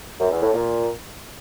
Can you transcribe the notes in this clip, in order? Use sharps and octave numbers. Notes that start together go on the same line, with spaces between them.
F#2
E2
A2
A#2